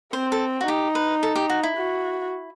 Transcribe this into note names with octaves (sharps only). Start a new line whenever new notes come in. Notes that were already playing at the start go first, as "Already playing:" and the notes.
C4 C5
A4
F#4
D#4 G4
B4
A4
G4
F#4
E4
F#4